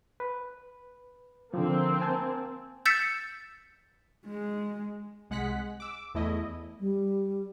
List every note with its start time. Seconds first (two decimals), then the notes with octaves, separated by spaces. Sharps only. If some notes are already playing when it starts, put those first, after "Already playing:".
0.20 B4
1.54 D3 F3 A#3 C4
2.01 G#5 A5 E6
2.85 E6 G6 A6 B6 C#7 E7
4.26 G#3
5.30 C2 G#3 F#5 F#6 B6
5.80 D6 E6
6.14 E2 A3 E4 D#5
6.80 G3